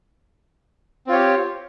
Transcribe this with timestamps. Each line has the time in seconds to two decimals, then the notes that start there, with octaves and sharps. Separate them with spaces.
1.07 C4
1.09 F4
1.12 C#5
1.14 G4